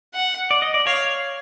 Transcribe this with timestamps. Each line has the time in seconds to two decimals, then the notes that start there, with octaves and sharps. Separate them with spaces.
0.14 F#5
0.51 D5
0.62 D#5
0.74 D5
0.87 C#5 F5